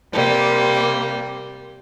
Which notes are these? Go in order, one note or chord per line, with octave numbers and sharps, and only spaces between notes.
C3 G3 A#3